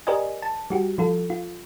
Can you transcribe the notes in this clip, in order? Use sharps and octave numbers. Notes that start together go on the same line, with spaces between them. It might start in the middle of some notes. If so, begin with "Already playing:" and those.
G4 A#4 C5 D5 D#5 G#5
A5
G3 F#4 G4
F3 F4 A4
F4